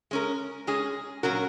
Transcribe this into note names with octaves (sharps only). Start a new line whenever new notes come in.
G#3 C#4 A#4
G#3 C#4 G#4
A#2 F#3 C#4 F#4 A#4